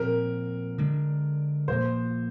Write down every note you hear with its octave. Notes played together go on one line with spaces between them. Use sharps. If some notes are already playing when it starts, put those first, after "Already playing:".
Already playing: A#2 F3 C4 A#4
D3 G#3 D4
A#2 F3 A#3 C5